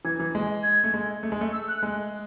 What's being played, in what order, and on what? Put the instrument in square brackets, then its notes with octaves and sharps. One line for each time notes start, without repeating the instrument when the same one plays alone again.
[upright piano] E3 [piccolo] G#6
[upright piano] E3
G#3
[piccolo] G#6
[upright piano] A3
G#3
A3
G#3
A3
[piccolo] E6
F#6
[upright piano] G#3